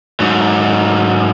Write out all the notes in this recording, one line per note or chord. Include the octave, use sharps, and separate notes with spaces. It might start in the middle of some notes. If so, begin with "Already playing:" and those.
G#2 F#3